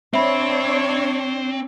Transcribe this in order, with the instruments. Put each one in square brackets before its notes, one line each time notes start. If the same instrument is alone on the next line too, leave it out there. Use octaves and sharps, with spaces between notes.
[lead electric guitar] C4 [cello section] D4 C#5 [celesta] E5 B5